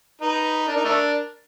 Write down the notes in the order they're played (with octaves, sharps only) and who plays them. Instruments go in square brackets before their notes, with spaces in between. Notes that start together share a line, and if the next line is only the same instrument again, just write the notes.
[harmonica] D#4 [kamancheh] B4
[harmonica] D4 [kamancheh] A#4
[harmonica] D#4
A3 D4